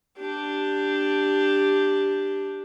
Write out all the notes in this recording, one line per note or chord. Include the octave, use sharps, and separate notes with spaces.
D4 G4